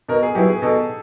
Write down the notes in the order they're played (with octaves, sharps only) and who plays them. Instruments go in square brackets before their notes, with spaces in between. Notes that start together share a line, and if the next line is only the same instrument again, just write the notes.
[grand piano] B2 [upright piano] A#4
[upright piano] G#4
[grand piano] F#3 B3 E4 [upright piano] G4
[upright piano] G#4
[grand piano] B2 [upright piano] A4